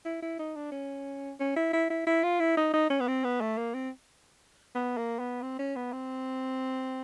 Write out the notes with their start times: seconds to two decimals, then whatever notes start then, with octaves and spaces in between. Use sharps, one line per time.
0.05 E4
0.22 E4
0.39 D#4
0.56 D4
0.72 C#4
1.40 C#4
1.56 E4
1.73 E4
1.90 E4
2.07 E4
2.24 F4
2.40 E4
2.57 D#4
2.73 D#4
2.90 C#4
3.00 B3
3.08 C4
3.24 B3
3.41 A3
3.58 A#3
3.74 C4
4.75 B3
4.97 A#3
5.19 B3
5.42 C4
5.59 C#4
5.76 B3
5.92 C4